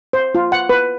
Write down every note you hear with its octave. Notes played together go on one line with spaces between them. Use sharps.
C5
F4
F#5
B4